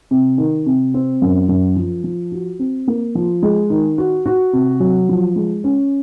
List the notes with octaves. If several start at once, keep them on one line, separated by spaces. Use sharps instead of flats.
C3
D#3
C3
C4
F#2
F#2
F3
F3
F#4
C4
A#3
F3
G#3
D#3
F#4
F#4
C3
F#3
F3
G#3
C#4